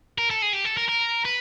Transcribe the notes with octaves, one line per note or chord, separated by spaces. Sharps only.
A#4
A4
G#4
G4
A4
A#4
A#4
B4